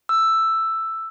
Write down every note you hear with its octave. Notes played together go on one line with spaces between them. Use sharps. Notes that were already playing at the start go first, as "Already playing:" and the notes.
E6